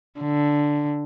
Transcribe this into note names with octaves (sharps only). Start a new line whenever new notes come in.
D3